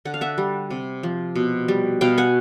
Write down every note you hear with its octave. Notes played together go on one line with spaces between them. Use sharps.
D3 F#5
F5
E5 F#5
G3
C3
F3
B2
G3
B2 F5 G5
F#5 G#5